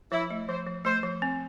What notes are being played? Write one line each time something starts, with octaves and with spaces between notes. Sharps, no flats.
F3 E4
A3
F3 C5
F3
A3 C5
F3
C4